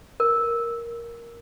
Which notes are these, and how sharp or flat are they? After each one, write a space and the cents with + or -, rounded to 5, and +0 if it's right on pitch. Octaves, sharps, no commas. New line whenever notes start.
A#4 +5